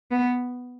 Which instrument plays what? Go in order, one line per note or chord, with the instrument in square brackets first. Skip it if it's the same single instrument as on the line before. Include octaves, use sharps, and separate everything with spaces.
[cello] B3